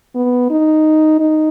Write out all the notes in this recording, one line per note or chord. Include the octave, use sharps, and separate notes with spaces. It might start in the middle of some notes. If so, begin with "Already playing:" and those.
B3
D#4
D#4